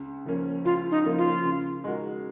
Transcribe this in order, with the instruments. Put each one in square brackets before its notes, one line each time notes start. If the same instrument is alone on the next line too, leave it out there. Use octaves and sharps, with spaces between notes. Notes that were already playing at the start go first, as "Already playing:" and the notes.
Already playing: [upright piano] C#2
C#3 F3 A#3 C#4
[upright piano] C#2 [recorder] F4
[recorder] D#4
[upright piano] C#3 F3 A#3 C#4
[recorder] F4
[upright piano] C#3
G#3 D#4 F#4 A#4